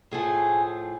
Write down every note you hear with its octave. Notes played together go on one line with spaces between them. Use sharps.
A2 F3 A3 G#4